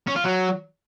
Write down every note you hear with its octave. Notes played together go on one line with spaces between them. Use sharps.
C#4
F4
F#3